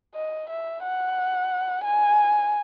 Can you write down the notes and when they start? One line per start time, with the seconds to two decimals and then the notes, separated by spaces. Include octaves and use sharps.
0.15 D#5
0.50 E5
0.83 F#5
1.84 G#5